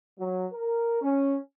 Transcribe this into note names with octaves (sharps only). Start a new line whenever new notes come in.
F#3
A#4
C#4